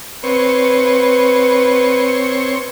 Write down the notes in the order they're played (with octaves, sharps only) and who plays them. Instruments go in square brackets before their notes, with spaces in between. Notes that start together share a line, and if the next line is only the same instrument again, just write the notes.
[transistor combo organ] C4 C#5 [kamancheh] B4